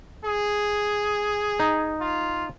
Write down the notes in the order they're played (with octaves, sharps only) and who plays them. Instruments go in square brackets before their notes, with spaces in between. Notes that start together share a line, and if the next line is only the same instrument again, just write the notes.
[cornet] G#4
[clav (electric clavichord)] D#4
[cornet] F4